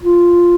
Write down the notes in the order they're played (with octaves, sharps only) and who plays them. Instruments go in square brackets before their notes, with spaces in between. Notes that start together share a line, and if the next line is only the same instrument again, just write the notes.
[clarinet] F4